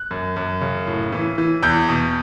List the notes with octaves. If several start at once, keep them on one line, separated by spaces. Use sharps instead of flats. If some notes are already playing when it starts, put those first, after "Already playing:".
Already playing: F#6
F#2
F#2
C#3
A2
E3
E3
E2 G6
B2